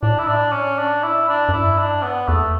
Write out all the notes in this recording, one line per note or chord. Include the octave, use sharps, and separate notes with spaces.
A2 D4
E4
D4
C#4
D4
E4
D4
F#2
G2 E4
D4
B3
E2 A3